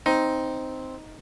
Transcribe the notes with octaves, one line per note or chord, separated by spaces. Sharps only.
C4 D#4